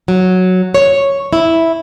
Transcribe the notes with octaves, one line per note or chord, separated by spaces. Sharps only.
F#3
C#5
E4